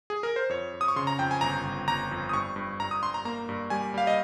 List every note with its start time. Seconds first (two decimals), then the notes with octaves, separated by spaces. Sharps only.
0.10 G#4
0.23 A#4
0.36 C5
0.49 F2 C#5
0.74 F2
0.81 D#6
0.88 C#6
0.96 C#3 C6
1.07 A#5
1.19 F2 G5
1.31 G#5
1.41 G1 A#5
1.65 G1
1.87 G1 A#5
2.11 F2
2.29 D#6
2.33 G2 C#6
2.56 G2
2.80 G2 A#5
2.91 D#6
3.02 G2 C6
3.14 A#5
3.25 A#3 A#5
3.49 G2
3.70 G3 G#5
3.94 G3 F5
4.07 D#5